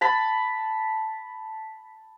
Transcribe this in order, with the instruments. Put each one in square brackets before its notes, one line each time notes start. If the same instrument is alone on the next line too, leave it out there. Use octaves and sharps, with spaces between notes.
[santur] A5 B5